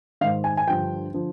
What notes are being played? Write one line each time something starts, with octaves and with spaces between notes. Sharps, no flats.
G#2 D#3 F5
G#5
G#5
G2 D3 F3 G5
D3 F3